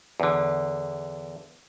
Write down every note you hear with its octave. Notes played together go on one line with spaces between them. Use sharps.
E2 D3